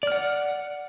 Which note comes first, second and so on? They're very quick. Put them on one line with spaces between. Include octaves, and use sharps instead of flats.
D5 F6 F#5